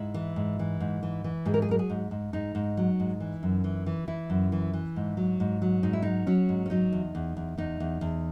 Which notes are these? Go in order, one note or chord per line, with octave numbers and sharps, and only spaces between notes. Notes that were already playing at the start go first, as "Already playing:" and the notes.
Already playing: G#2 E4
E3
G#2
E3
G#2
E3
E3
G#2 G#4
A#4
G#4
F#3 A#4
G#4
G#2
G#2
G#2 D#4
G#2
F#3
G#2
E3
F#2
E3
E3
E3 E4
F#2
E3
E3
G#2
F#3
G#2
F#3
G#2 D#4
E4
F#3 D#4
F#3 C#4
G#2
C#4
F#3 D#4
E2
E2
E2
E2 D#4
E2
E2